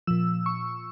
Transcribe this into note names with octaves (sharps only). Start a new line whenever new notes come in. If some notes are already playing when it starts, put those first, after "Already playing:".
A#2 F3 E6
C#6